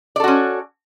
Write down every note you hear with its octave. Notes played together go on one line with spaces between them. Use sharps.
C#4 F#4 A4 D5